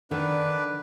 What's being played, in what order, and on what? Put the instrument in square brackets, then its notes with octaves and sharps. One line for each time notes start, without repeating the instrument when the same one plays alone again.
[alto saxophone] D3 [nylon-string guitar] D#3 [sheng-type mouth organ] D4 B4